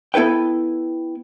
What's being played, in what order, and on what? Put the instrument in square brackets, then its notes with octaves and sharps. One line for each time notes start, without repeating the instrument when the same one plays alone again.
[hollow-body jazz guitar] B3 E4 A4 B4 G5